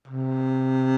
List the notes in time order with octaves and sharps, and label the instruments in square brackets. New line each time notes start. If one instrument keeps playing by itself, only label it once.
[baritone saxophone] C3